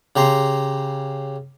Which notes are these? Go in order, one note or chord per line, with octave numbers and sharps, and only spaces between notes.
C#3 G4 A#5 C6